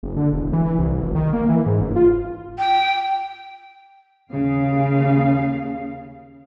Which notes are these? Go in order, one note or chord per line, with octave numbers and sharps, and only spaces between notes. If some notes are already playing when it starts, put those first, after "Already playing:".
F#1
D3
E1
E3
C2
F1
D#3
A#3
E3
G#2
F#1
F4
G5
D#2 C#3 F5